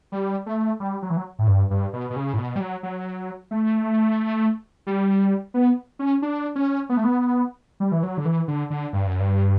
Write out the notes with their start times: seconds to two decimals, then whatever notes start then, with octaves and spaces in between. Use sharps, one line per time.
0.12 G3
0.46 A3
0.80 G3
1.02 F#3
1.10 E3
1.17 F#3
1.39 A2
1.47 G2
1.71 G2
1.93 B2
2.10 B2
2.16 C#3
2.33 A2
2.38 B2
2.56 G3
2.61 F#3
2.83 F#3
3.51 A3
4.87 G3
5.54 B3
5.99 C#4
6.22 D4
6.56 C#4
6.89 B3
6.97 A3
7.04 B3
7.80 G3
7.92 E3
8.03 F#3
8.18 D3
8.25 E3
8.48 D3
8.70 D3
8.93 G2
9.06 F#2
9.19 G2